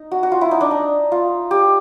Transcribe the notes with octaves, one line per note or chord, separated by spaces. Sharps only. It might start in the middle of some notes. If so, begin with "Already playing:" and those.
Already playing: D#4
F#4
F#4
F4
E4
D#4
D4
D#4
F4
G4